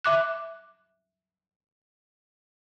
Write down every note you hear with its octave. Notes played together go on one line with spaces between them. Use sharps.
E5 D6 F#6